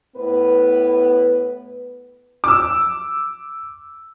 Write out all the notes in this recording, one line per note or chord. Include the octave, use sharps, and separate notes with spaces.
A2 B3 B4
D6 E6